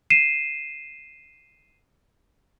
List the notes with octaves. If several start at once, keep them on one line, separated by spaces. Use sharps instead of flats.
C7 D#7 E7